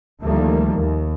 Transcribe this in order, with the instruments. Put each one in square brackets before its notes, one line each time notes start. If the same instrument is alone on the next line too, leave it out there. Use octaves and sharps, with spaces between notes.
[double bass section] D2 D#3 F3 G3 A3 A#3
D#2